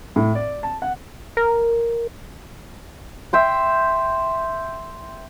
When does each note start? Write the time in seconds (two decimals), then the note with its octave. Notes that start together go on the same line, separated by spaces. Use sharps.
0.16 A2
0.35 D5
0.63 A5
0.82 F#5
1.37 A#4
3.33 E5 G5 C6